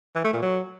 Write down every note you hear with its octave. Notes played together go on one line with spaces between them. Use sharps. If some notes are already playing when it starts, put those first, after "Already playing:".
E3
A3
A#2
F#3